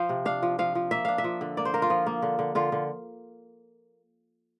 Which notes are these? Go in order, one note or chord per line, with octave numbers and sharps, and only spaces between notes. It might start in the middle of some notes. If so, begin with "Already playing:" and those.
Already playing: F3 C5 F5
C3
D4 F5
F3
F3 F5
F3
A#3 E5
D4 F5
E5
F3
D3
A#3 D5
C5
A#3 A#4
F4
F3
A#3
D3
D3
D3 F4
D3